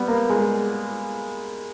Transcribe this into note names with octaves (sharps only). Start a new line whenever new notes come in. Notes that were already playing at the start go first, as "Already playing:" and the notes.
Already playing: G3 B3
A#3
G#3